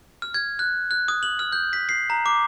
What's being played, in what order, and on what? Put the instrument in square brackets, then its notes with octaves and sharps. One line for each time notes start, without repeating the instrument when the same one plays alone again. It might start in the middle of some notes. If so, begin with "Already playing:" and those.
[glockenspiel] F6
G#6
F#6
F#6
D#6
F#7
F6
G6
B6
C7
A#5
D6